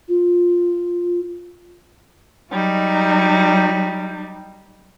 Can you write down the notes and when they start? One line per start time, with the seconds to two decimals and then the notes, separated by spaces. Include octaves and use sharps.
0.09 F4
2.51 F#3 G3 D#4